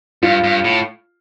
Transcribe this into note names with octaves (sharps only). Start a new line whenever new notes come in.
G2 F4
G2
A2